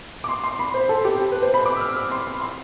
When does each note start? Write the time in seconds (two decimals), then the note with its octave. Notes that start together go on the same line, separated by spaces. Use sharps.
0.24 D6
0.29 C6
0.44 C6
0.59 B5
0.74 C5
0.89 A4
1.05 G4
1.32 B4
1.43 C5
1.54 B5
1.66 D6
1.76 E6
1.80 F6
1.96 E6
2.11 C6
2.27 B5
2.41 C6